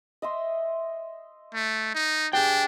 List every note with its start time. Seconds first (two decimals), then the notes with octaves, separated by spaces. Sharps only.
0.22 D#5 E5 C6
1.54 A3
1.95 D#4
2.33 D4 G4 G#4 G5